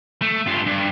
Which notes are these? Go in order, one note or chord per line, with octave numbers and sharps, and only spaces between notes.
A3
G2 F4
G2